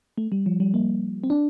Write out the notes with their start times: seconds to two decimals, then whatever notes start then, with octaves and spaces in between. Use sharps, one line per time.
0.18 A3
0.32 G3
0.46 F3
0.60 G3
0.74 A#3
1.24 C4
1.30 D4